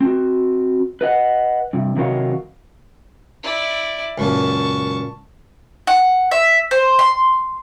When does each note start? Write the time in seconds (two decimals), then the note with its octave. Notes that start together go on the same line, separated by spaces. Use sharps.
0.01 C4 F#4
1.01 B4 D#5 F#5
1.73 G2 C3
1.96 C3 D#3 F#3 A#4 C#5 F5
3.43 E4 D5
4.18 C#2 F#2 A#2 A5 C#6
5.87 F#5
6.31 E5
6.71 C5
6.99 C6